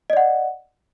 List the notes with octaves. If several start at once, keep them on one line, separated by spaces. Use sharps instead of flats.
D5 D#5 F#5